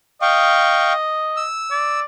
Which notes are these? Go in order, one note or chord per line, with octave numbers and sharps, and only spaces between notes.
D#5 F5 G5 C#6
E6
D5